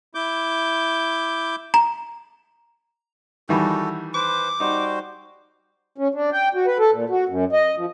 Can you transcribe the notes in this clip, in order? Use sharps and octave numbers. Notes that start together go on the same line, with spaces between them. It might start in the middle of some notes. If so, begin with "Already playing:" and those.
E4 D6 G6
A#5
D#3 E3 G3 F#4 A4
B4 C5 D6
G3 D#4 F#4 C5
C#4
D4
G5
F#4
B4
A4
A#2
F#4
F#2
D#5
F3